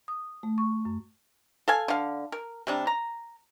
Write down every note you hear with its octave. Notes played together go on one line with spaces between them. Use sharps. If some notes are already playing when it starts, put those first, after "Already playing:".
D#6
A3
C#6
F#2
A4 F5 G#5
D3 F5
A#4
C3 G3 D4
A#5